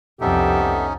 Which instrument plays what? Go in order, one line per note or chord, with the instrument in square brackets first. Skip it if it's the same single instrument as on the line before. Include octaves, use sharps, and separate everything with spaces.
[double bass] C2 F2 [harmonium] B3 A4 E5 [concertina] C#4 D#4 [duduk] G4